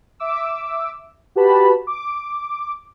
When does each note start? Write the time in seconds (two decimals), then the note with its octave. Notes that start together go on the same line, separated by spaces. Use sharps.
0.20 E5 D6 E6
1.35 F#4 G4 B4 A5 B5
1.87 D6